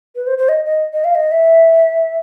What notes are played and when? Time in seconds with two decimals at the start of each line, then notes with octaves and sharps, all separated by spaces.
0.16 B4
0.27 C5
0.38 C5
0.49 D#5
0.65 D#5
0.93 D#5
1.04 F5
1.15 D#5
1.31 E5